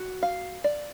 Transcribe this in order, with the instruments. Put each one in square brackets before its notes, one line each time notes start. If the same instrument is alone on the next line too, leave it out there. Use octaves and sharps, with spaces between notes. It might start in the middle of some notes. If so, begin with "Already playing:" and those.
Already playing: [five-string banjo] F#4
F5
D5